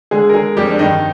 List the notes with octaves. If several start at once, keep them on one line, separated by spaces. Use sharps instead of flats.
D3 G#3 G#4
A#4
D3 G#3 G#4
F2 G3 G4
D4
G2 D#3 D#4